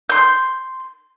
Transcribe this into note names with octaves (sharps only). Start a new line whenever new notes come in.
C6 G6